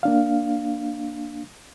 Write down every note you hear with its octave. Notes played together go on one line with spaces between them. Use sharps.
A#3 D4 F5